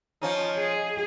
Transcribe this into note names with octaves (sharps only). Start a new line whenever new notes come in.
F3 C#4 D#4
G#4